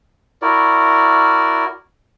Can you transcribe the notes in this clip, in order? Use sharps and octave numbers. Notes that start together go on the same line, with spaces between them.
E4 F#4 A#4 D5